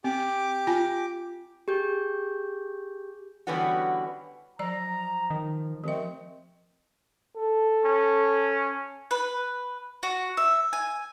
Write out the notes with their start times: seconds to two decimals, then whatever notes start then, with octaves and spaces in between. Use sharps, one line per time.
0.04 C4 G4 D6
0.67 F4 G#5
1.68 G4 G#4 G6
3.47 D3 E3 G3 B3 C#4 F#4
4.59 F3 F#3 D5 A#5
5.30 D#3
5.84 D#2 F3 A3 C4 D#5
7.37 A4
7.84 C#4
9.11 B4
10.03 F#4
10.37 E5
10.73 G#5